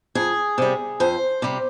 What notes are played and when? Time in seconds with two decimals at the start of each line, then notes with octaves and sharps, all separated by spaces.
0.15 F2 G#4
0.58 C3 G3
1.00 F2 C5
1.42 C3 G3